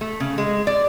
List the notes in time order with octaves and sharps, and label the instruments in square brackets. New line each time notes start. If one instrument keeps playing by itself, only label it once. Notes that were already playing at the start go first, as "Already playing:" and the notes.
[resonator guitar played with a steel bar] A3
C#3
G#3
D5